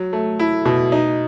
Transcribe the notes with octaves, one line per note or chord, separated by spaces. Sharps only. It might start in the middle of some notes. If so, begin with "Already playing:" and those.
Already playing: F#3
A3
E4
B2
D#4